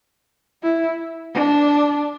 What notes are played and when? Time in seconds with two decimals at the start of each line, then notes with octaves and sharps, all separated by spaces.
0.63 E4
1.34 D4